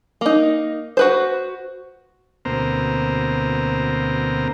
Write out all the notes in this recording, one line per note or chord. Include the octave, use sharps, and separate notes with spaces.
A#3 D#4
F#4 B4 C5
D2 B2 A#3 C4 C5 A#5